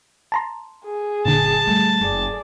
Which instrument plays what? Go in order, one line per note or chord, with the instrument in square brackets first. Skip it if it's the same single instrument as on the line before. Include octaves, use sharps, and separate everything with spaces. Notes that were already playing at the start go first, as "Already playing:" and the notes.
[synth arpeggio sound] A5 A#5 C6
[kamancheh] G#4
[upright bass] F#1 [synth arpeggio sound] A#2 D3 [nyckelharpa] A5
[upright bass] G3 A3
[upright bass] F#1 [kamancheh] G#4 D5